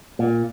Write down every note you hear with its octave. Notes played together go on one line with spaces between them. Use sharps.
A#2